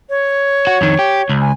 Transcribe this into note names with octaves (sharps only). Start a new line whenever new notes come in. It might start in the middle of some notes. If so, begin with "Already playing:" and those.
C#5
F#4
F2 D#3
G4
C#2
G#5